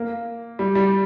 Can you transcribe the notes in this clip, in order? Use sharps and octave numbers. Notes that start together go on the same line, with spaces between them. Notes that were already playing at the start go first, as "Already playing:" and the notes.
Already playing: A#3
G3
G3